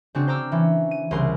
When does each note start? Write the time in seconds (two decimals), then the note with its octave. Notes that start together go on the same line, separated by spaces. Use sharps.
0.15 C#3 C4 D4 F#4
0.27 C5 A#5 D6 E6 F6
0.52 E3 C#4
0.91 D#7
1.11 C2 C#3 A#4 C6